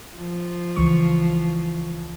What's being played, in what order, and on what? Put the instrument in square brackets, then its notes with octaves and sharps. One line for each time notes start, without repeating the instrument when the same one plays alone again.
[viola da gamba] F3
[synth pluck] C#2 E3 C#6